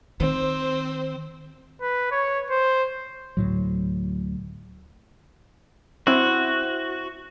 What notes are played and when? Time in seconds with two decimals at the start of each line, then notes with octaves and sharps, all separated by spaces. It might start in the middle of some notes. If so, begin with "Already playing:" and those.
0.20 D#3 C4 C5
1.82 B4
2.12 C#5
2.51 C5
3.37 D2 A2 F#3
6.07 C4 E4 F#4